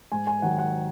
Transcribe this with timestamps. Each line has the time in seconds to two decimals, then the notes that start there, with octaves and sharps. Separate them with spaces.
0.12 G#2 G#5
0.27 G#5
0.42 D#3 F#3 F#5
0.58 F#5